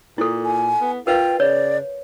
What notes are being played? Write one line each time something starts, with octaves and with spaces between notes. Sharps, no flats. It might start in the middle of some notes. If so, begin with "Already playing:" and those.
A#2 E4 A4
G#5
B3
F4 A#4 B4 F5 G5
C#3 C#5 D5